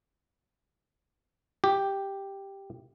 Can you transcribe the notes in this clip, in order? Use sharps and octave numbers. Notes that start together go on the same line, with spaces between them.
G4